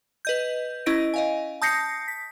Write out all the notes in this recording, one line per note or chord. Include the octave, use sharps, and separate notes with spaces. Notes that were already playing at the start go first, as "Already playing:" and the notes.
B4 D#5 G6
C#4 E4 D#5 A#6 D7
D#5 F5 G#5
A5 D#6 G6 A#6 C7 C#7
B6